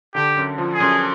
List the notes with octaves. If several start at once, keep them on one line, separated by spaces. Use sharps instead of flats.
D3 G4
F#2
F3
G#4
F#2